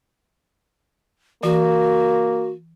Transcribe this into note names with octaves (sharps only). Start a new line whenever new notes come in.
E3 A#3 F#4